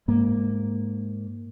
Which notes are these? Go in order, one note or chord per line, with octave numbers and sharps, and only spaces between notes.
G#2 A#3